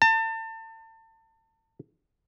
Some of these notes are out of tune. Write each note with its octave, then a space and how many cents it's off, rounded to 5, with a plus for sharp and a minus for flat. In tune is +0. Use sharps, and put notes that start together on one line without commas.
A5 +35